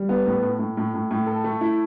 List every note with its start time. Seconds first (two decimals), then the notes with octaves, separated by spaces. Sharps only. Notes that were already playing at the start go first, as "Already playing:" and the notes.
Already playing: G3
0.09 B3
0.26 A2
0.43 A2
0.59 A2
0.77 A2
0.94 A2
1.11 A2
1.27 A4
1.44 A3
1.61 E4